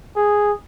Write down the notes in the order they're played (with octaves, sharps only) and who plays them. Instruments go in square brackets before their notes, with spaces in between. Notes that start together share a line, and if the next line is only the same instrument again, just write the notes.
[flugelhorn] G#4